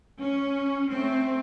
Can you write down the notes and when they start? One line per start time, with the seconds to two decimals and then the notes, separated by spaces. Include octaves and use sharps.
0.19 C#4
0.90 A3 C4